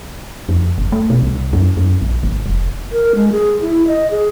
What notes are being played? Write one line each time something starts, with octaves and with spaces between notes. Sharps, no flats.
F2
G1
A3
B2
C2
F#2
F#2
A#1
G#1
F1
A#4
G#3
G#4
E4
D#5
G#4